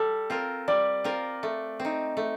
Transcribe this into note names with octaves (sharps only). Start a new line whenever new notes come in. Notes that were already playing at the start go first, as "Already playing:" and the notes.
Already playing: G3 A4
C4 F4 A#4
G3 D5
C4 F4 A#4
A3
C4
D#4
A3